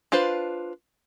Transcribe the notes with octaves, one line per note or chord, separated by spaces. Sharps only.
D4 F4 B4 C5